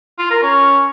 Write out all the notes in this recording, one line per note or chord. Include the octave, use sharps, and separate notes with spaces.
F4
A#4
C#4